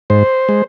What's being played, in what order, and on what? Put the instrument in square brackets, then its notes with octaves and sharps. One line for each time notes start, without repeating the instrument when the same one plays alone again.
[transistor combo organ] G#2 C5
G#3